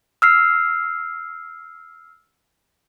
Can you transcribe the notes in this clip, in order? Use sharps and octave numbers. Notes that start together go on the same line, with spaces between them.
E6 F6 C7